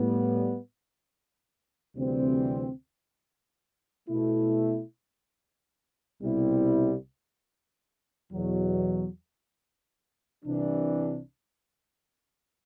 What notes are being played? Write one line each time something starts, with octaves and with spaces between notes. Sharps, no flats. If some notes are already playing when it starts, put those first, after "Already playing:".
Already playing: A2 G3 B3
D2 C3 E3 G3 C4
B2 A3 E4
C2 B2 G3 C4 E4
E2 B2 F#3
C2 C3 E3 G3 D4